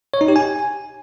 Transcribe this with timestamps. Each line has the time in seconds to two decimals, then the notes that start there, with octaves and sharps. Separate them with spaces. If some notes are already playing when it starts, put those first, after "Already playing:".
0.14 C#5
0.21 D#4
0.28 G4
0.36 G#5